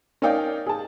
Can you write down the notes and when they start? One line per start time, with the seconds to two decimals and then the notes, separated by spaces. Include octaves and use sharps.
0.22 C#4 D#4 A#4 D5 F5 G5
0.66 G#4 A5